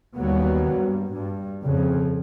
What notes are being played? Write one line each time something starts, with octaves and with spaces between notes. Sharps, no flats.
D#2 F#3 G3 A#3 B3
G2
G2
F2 C#3